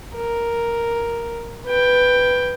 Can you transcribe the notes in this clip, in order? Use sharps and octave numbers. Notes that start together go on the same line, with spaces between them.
A#4
B4 G5